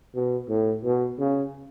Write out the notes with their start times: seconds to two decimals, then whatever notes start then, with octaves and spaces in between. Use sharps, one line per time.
0.15 B2
0.49 A2
0.84 B2
1.19 C#3